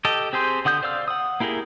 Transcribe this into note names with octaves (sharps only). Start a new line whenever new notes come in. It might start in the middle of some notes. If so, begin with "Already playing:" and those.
G4 A4 D#5
C4 G4 G#4 C5
D3 F#5 D#6 G6
C5 D5 F5 E6 F6
F#5 D#6
A#3 E4 G4 G#4 A#4